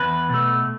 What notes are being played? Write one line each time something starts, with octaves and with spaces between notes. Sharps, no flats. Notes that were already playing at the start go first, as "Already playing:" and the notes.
Already playing: E2 B4
B2 A3